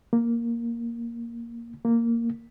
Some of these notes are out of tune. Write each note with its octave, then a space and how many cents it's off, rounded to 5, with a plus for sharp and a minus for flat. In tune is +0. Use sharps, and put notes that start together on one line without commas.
A#3 +0
A#3 -10